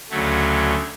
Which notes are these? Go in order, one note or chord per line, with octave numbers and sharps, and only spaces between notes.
D2 C#3 F#3 A3